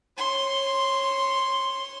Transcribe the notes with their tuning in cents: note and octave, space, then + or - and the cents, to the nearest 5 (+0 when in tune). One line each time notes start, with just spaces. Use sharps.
C#5 -20 C6 +0